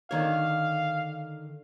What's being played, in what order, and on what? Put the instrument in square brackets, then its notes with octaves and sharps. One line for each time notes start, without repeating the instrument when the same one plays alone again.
[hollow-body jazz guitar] D3 D#3 C#5 [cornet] F5